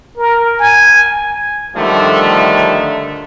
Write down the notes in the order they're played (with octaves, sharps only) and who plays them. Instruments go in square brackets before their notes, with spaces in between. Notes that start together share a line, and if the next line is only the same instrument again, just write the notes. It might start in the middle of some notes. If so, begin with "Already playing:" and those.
[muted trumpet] A#4
G#5
[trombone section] D3 D#3 F3 G3 A3